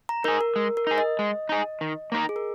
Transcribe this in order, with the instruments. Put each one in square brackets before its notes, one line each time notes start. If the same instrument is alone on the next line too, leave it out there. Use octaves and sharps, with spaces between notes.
[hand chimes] A#5
[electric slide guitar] D#4 G#4 [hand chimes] A#4
[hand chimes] A#4
[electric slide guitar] G#3
[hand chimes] A#4
[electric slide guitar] D#4 G#4
[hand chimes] D#5
[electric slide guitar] G#3
D#4 G#4
D#3
A#3 D#4 A#4
[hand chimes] G#4
A#4